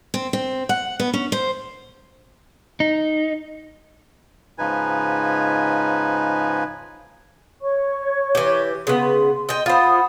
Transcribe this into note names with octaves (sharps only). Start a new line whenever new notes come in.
C4
C4
F#5
B3
C#4
C5
D#4
G#2 C#3 F3 D#4 B4 G#5
C#5 C#6
E3 G4
C#3 B3 C6
D#5 G5
F4 C5 F#5 B5 D#6